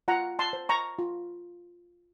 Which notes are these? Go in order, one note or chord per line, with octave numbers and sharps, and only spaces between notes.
F4 F#5 A#5
A5 C6
C5
A#5 C#6
F4